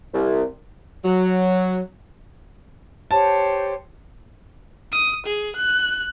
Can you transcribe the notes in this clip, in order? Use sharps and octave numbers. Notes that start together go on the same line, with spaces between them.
C2
F#3
G4 C5 C#5 A5
D#6
G#4
F#6